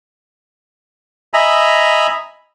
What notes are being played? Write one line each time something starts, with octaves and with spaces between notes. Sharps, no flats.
D#5 E5 G#5 A#5 B5